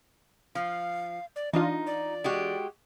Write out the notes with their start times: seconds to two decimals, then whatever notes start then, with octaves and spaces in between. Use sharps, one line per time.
0.55 F3 F5
1.36 D5
1.53 E3 D4 D#4 F4 D#5
1.87 D5
2.24 G#3 F#4 G4